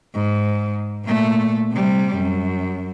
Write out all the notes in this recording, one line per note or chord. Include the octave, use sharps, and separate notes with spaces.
G#2
A#2 A3
C3 G3
F#2